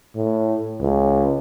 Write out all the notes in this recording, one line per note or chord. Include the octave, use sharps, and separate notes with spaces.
A2
C#2